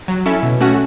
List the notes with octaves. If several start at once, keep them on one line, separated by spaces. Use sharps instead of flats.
F#3
C#4 E4 A4 E5
B2
A3 C#4 F#4